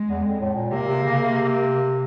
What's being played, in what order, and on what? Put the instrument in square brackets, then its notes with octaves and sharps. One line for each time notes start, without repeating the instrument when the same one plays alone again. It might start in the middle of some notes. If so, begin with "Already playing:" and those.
Already playing: [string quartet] G#3
[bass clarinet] E2
F2
A2
A#2
[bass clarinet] C3 [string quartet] A#3
[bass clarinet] C3
C#3
C3